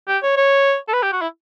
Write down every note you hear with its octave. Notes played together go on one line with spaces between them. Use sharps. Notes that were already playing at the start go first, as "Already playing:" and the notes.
G4
C#5
C#5
A4
B4
G4
F#4
E4